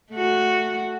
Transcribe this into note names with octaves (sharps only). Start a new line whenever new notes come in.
A3 F#4